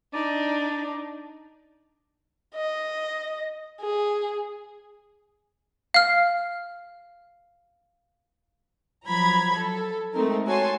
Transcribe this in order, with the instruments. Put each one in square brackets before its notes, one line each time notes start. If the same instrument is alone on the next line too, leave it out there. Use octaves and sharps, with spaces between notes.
[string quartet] D4 D#4 [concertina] D5
[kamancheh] D#5
G#4
[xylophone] F5 F6
[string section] F3 F#3 A#5 B5 G#6
A4
G#3 A3 C4 D#4 A#4
F#4 A4 C#5 G#5 A5 C6